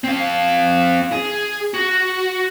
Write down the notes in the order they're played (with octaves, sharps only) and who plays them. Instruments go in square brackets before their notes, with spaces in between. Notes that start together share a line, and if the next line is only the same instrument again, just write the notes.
[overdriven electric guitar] C4 F5
G#4
F#4